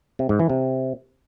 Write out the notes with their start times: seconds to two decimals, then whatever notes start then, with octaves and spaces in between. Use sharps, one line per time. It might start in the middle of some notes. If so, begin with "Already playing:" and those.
0.19 C3
0.29 G#2
0.39 E3
0.49 C3